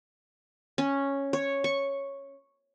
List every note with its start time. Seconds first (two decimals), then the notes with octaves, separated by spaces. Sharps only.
0.78 C#4
1.33 C#5
1.64 C#6